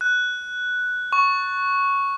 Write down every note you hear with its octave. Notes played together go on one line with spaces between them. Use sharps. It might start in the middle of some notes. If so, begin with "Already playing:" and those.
F#6
C#6